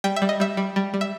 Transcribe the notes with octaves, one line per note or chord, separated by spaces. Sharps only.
G3 G5
E5
G3
D#5
G3 E5
G3
G3
G3
E5